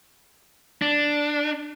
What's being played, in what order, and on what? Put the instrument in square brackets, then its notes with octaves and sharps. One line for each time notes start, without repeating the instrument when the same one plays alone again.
[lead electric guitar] D4